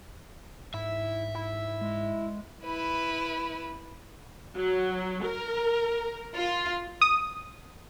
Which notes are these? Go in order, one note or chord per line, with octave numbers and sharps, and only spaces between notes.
G#2 E4 E5
E4
G#3
E4 B4
F#3
A#4
F4
D#6